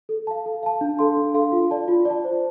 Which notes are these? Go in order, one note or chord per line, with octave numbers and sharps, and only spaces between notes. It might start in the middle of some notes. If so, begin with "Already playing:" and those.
A4
F5 A5
A4
F5 A5
D4
A4 F5 C6
D4
A4 F5 C6
F4
D5 A5
F4
D5 A5
C5